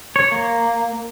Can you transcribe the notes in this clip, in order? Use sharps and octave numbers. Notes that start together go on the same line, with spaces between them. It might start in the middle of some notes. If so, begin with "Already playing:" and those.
C#5
A#3